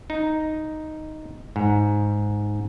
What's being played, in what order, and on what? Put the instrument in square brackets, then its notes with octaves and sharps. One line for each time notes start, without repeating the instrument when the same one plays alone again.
[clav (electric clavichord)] D#4
G#2